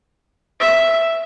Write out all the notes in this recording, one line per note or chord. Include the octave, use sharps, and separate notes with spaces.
E5